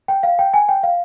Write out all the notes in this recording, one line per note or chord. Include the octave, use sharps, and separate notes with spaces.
G5
F5
G5
G#5
G5
F5